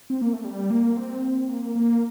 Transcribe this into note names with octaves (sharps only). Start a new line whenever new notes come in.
C4
A#3
A3
G3
A#3
C4
A#3
A#3